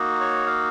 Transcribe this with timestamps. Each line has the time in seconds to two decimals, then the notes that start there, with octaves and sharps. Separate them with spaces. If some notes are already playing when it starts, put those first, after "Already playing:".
Already playing: A#3 D#4 F#4
0.21 C#5
0.47 F5